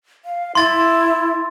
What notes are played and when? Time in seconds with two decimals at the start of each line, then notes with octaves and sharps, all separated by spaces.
0.25 F5
0.55 E4 C6 A6